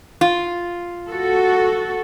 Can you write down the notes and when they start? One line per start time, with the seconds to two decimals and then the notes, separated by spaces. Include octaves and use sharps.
0.21 F4
1.09 F#4 A4